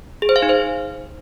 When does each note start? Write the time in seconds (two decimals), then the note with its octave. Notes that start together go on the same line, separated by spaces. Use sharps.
0.22 G#4
0.29 C5
0.36 F5
0.42 D#4
0.49 C5